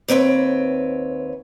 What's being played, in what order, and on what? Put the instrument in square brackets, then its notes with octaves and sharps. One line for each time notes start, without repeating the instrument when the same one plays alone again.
[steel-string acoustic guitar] D#2 C4 B4 C#5